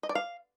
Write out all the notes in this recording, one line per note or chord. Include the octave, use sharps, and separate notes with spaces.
D#5
D5
F5